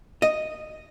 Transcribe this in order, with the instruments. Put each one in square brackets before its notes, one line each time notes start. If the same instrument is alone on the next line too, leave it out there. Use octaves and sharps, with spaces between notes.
[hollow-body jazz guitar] D#5